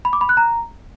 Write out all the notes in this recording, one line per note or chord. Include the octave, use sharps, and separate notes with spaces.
B5
D6
B5
F#6
A#5